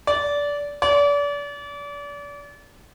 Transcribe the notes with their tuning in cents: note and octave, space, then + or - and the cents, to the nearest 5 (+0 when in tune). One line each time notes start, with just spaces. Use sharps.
D5 -20
D5 -35